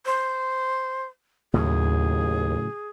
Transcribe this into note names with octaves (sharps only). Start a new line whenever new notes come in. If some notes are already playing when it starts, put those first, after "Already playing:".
C5
D#2 A2 C#3 F#3 G#4